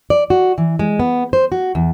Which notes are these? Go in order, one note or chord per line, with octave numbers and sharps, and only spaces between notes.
D5
F#4
E3
G#3
B3
C5
F#4
E2